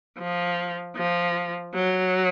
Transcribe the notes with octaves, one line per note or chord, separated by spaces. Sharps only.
F3
F3
F#3